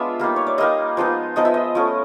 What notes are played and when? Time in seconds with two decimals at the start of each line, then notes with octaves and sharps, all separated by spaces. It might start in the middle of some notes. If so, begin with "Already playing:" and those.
Already playing: G#3 B3 D4 F4 E5
0.19 G3 A#3 D#4
0.36 C#5
0.47 D5
0.58 G3 A#3 D#4 D#5
0.97 F3 G#3 B3 D#4
1.36 F3 G#3 B3 D#4 D#5
1.45 E5
1.54 D#5
1.75 F3 A3 C#4